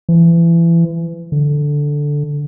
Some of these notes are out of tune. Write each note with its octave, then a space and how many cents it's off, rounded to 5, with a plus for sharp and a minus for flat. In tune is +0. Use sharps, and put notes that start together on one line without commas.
E3 +30
D3 -5